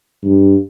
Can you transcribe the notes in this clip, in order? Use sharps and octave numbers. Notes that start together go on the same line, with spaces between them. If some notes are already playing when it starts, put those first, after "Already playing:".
G2